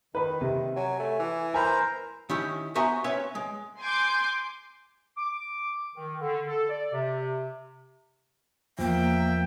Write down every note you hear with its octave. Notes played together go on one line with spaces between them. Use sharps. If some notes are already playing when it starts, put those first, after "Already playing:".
D#3 B4 B5
C3
F#3 G#5
A3
E3
A#4 C5 G#5 A#5 B5
D#3 C#4 E4 G4
B3 F#4 C5 E5 G#5 A#5
C4 C#4 B4 C#5 E5
G#3
G#5 C6 D6 G6
D6
D#3
D3
A4
D5
C3
E2 F3 A#3 E5 G5